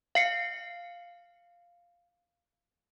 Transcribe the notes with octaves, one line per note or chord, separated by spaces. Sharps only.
F5 C7 C#7